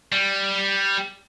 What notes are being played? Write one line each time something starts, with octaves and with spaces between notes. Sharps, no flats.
G3